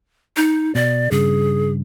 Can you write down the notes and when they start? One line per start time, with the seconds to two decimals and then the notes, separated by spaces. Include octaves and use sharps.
0.37 D#4
0.75 B2 D5
1.11 G2 C#3 G#4